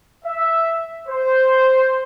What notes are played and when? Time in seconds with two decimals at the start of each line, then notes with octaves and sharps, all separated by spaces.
0.24 E5
1.07 C5